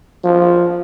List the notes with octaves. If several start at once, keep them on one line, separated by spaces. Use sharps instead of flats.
F3